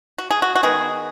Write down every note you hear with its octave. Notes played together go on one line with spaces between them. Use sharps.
F#4
G#4
F#4
F#4
D#3 G#3 B3 G#4